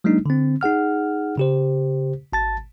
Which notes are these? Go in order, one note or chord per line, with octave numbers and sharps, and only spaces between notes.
F#3 G#3 A#3 D4 D#4
D3 C4
D#4 G#4 F#5 F6
C#3 G4 C5
G#1 A5 A6